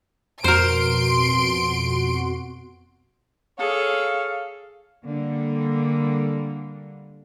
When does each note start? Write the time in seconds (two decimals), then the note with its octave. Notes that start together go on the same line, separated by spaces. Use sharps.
0.44 F2 B2 F#4 A#4 C5 C6 D7
3.59 G#4 A4 C#5 F5
5.05 D3 G3 A#3